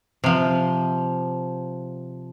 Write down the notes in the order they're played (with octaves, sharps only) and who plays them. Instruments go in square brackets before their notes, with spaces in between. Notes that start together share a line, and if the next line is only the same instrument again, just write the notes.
[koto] C3 F3